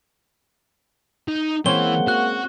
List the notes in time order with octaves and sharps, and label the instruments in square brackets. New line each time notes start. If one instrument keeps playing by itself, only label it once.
[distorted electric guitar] D#4
[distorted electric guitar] E3 [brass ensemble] G#3 A#3 F#5 [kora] C4 C#4 [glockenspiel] G7
[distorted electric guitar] F#4 [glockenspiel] F#6